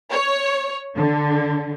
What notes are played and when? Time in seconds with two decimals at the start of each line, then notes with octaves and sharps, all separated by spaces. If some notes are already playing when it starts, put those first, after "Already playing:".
0.11 C#5
0.97 D3